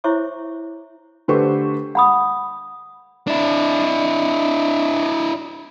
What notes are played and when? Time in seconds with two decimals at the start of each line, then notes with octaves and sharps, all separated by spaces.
0.04 E4 C5 C#5 E5 C#6 D6
1.28 D3 A3 G4 B4 C5 C#6
1.95 F#5 B5 D#6
3.27 D4 E4